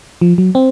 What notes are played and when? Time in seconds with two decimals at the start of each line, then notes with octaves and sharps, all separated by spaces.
0.21 F3
0.38 F#3
0.55 C4